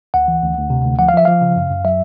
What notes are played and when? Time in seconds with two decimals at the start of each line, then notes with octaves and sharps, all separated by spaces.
0.14 D2 F#5
0.28 E3
0.42 D2
0.57 D2
0.70 C3
0.85 D2
0.99 F3 F#5
1.08 F5
1.14 F3 E5
1.25 F3 F5
1.41 C#3
1.56 F#2
1.70 F#2
1.85 F#3 E5